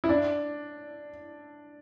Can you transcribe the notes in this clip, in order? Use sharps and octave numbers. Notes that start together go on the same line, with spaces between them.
E4
D4